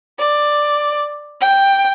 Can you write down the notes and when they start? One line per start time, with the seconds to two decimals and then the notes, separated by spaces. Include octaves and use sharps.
0.20 D5
1.42 G5